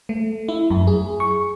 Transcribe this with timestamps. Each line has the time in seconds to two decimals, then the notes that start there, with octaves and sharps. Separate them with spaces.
0.09 A3
0.49 E4
0.70 F#2
0.87 G#4
1.20 C#6